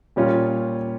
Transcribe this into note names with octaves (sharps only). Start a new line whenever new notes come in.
A#2 G3 C#4 F4